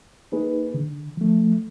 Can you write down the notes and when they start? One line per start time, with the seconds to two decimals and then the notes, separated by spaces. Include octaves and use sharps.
0.32 A#3 D#4 G#4 B4
0.74 D3
1.17 F3 A3